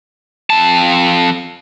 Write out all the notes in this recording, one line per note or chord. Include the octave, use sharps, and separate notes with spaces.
F2 A5